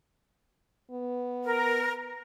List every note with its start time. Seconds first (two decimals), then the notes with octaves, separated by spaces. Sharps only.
0.91 B3
1.45 A#4